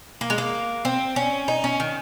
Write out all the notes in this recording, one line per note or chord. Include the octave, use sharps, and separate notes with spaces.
A#3
G#3
A#3
C4
C#4
D#4
C#4
D#3